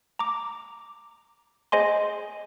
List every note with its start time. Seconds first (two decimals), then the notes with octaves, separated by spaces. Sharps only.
0.19 A#5 D6
1.72 G#4 C5 D#5 G#5 C6